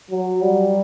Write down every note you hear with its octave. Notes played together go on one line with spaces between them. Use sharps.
F#3
G3